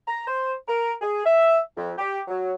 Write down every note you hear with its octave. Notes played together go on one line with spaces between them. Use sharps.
A#5
C5
A#4
G#4
E5
F2
G4
F#3